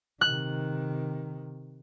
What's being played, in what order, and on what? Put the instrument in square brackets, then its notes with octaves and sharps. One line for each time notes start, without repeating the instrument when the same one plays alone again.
[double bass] C3 D#3 [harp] F#6